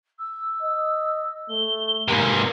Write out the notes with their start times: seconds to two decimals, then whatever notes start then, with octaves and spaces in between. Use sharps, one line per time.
0.19 E6
0.62 D#5
1.49 A3 G7
2.08 G#2 C3 A#3 C6